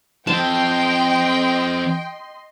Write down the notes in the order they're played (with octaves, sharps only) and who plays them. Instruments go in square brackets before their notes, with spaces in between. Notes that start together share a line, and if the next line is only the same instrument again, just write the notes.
[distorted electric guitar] F3 C4 [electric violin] D#5 C6 [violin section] G5 [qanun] A5